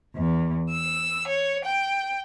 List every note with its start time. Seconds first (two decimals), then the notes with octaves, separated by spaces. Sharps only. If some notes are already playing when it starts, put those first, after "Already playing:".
0.15 E2
0.71 E6
1.28 C#5
1.65 G5